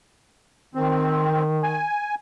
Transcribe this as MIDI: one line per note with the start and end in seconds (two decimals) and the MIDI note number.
0.75 1.85 51
0.75 1.43 60
1.63 2.15 80